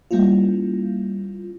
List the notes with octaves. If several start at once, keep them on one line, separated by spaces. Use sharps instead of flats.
G3 A#3 C#4 E4 F4